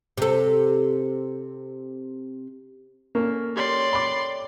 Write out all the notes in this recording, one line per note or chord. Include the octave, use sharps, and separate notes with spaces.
C3 A4
A#3 C#4 A4
G4 C#5 D5 C6
B5 D6